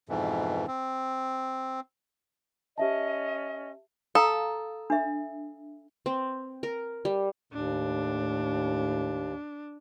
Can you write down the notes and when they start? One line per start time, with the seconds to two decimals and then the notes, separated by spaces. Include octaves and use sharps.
0.09 F2 G#2 B2 E3
0.68 C4
2.78 C#4 G4 D#5 E5 A5
4.15 A4 F5 A#5 D#6
4.90 D4 E5
6.06 C4
6.63 A#4
7.05 G3
7.53 D#2 A2 D4